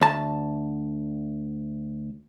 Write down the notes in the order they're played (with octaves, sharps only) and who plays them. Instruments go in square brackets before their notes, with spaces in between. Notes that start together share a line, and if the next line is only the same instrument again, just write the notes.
[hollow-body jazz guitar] D2 A5